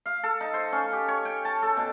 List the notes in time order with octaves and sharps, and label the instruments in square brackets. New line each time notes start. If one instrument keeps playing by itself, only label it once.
[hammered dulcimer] F5
A4
D#4
C5
C#4
G4
C#5
G5
A5
A4
B2